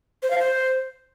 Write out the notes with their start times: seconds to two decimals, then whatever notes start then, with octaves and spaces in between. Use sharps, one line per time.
0.23 C5
0.31 F5
0.38 C5